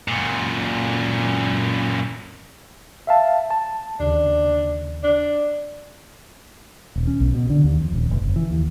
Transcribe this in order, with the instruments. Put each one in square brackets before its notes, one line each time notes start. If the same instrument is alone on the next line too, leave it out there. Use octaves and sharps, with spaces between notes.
[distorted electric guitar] F#2 A#2
[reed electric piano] E5 F5 A5
A5
[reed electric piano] D#2 C#3 [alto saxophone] D4
[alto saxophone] D4
[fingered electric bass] D#1
C#4
B1
B2
D3
D#2
F2
D#1
F1
F#1
E3
D#2